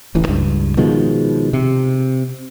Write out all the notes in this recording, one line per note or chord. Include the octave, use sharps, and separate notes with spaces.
D1 A1 E3
C#2 G2
B2 D#3 F3 G#3
C3